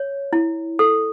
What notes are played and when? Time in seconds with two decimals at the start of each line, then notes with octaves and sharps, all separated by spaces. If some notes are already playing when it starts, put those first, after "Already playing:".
Already playing: C#5
0.33 E4
0.79 A4